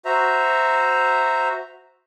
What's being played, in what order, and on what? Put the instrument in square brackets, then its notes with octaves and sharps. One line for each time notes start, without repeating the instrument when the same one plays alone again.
[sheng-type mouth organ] F#4 C5 E5 A#5